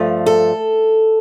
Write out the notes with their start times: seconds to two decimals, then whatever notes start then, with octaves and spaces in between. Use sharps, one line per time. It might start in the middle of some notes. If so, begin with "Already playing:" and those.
Already playing: G2 F3 A3
0.26 A4